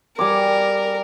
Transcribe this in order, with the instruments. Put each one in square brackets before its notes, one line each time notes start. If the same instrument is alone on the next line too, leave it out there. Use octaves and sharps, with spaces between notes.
[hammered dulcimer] G3 G#5 D6 [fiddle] A#4